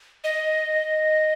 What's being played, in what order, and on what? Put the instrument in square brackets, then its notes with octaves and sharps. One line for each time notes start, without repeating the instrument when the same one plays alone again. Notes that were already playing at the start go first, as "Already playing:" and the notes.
[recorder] D#5